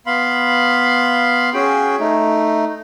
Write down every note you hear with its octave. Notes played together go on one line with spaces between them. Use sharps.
B3 F5 B5 C6
C#4 F#4 G#4 G5
A3 D#4